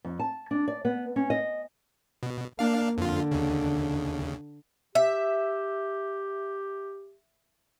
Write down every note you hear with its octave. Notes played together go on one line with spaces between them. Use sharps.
F2
A5
D4
D5
B3
C#4
D#5
B2
A#3 D4 F5
F2 D3 F4
D#2 C#3
G4 E5